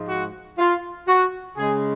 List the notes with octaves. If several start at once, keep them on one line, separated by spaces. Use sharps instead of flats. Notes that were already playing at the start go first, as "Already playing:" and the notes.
Already playing: G#2 F3 G#3
F#4
F4
F#4
C#3 G#3 G#4